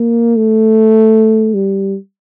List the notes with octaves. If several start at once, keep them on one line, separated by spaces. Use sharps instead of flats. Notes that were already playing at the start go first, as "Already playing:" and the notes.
Already playing: A#3
A3
G3